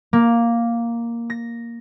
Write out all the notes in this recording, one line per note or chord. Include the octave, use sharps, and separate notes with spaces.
A#3
A#6